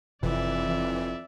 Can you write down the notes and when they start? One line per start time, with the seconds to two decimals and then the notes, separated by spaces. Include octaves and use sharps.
0.23 F#1 F2 C3 E3 D5 E5